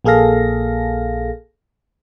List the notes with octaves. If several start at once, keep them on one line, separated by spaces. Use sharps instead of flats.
A#1 A#3 G#4 A4 F5 A#6